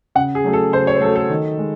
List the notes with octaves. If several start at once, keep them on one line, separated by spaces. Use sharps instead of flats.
C#3 F#5
G#4
F#3 A3
A4
C#3 C5
C#5
C5
F#3 A3 A4
A4
D#3
G#3